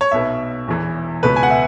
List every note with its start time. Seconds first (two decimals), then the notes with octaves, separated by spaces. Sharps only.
0.01 C#5
0.11 B1 B2 B3 E5
0.67 E1 E2 E3
1.23 C#2 B2 B3 B4
1.36 G#5
1.43 F#5
1.50 E5